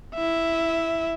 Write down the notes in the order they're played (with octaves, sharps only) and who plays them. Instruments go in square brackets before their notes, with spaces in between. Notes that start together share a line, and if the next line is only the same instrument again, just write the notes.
[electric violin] E4 E5